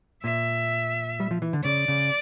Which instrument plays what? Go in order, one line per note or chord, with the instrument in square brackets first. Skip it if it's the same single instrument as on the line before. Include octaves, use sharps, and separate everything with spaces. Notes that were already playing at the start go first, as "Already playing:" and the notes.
[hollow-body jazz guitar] A#2 [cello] E5
[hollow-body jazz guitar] G3
F3
E3
D3
[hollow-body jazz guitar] C#3 [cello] D5
[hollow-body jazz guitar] C#3